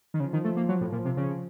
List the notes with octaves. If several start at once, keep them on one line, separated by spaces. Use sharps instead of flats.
D#3
C#3 F3
D#3
A3
A#3
F#3
A2
A#2 F3
C3
C#3